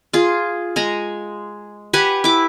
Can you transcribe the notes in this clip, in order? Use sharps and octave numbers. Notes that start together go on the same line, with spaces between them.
F4 G#4
G#3 G#5 A#5
G4 B4 F#5 G#5
E4 D6